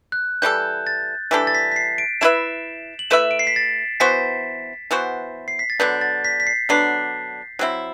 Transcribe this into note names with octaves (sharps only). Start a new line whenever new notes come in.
F#6
E3 G3 D4 A4 G6
A6
E3 G3 D4 A4 B6
A6
B6
B6
C7
D7
A3 E4 B4 E5 E7
F#7
A3 E4 B4 E5 E7
D7
C7
B6
A6
E3 B3 F#4 C5 B6
E3 B3 F#4 C5
C7
B6
A6
D3 F#3 B3 D4 G6
A6
B6
B6
C7
D3 F#3 B3 D4 C7
F#3 C4 E4